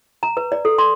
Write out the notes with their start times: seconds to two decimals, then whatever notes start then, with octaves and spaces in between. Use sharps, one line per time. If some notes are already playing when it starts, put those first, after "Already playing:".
0.23 A#5
0.37 B4
0.52 D5
0.65 A4
0.78 C6